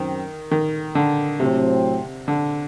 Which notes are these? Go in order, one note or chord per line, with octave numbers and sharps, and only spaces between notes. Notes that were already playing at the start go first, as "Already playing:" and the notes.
Already playing: F#2 D#3 C4
D#3
D3
A2 C3 F#3 C4
D3